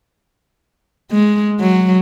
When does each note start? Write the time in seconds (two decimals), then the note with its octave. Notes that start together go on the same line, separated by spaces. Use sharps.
1.11 G#3
1.61 F#3